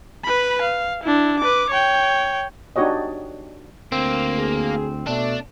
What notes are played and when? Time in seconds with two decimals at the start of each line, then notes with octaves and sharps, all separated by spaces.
0.24 B4 B5
0.61 F5
1.03 D4 E4
1.40 B4 D6
1.70 C#5 G5
2.76 D4 D#4 F#4 G4 C#5 D#5
3.92 D2 A#3 C4
4.38 G#4
5.07 B2 A3 D4